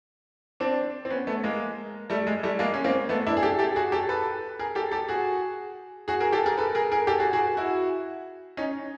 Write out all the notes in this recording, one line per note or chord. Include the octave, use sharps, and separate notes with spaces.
C4 D4
C4
B3 C#4
A3 B3
G#3 A#3
G3 A3
G#3
G3 A3
G#3 A#3
C#4
A#3 C4
A3 B3
D4 E4
G#4
G4 A4
G4 A4
F#4 G#4
G4 A4
A4 B4
G#4 A#4
G4 A4
G4 A4
F#4 G#4
F#4 G#4
G#4 A#4
G4 A4
G#4 A#4
A4 B4
G#4 A#4
G#4 A#4
G4 A4
F#4 G#4
F#4 G#4
E4 F#4
C#4 D#4